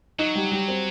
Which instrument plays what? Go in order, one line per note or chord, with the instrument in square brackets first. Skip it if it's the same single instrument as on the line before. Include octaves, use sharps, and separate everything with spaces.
[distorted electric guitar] F#3 [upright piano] D#4
[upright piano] G3
G3
C4